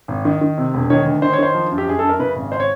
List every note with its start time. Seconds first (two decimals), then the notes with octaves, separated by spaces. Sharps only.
0.08 G#1
0.25 D#3
0.41 D#3
0.58 C3
0.74 E1
0.90 D#3 C#5
1.06 D2
1.22 D#3 C5
1.33 C#5
1.38 D#3 C5
1.55 F3
1.71 F#2
1.78 G4
1.88 F#2 G#4
1.99 F#2 A4
2.09 A#4
2.19 C#3 B4
2.36 G#1
2.52 C5
2.60 C#5